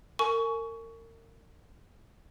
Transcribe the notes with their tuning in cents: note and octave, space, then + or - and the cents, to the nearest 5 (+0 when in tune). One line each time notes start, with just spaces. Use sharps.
A#4 -35 G#5 +25 C#6 +20